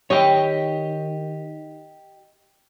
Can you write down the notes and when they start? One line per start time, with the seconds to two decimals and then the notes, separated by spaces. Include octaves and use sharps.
0.10 D#3 G4 C#5 D#5 G5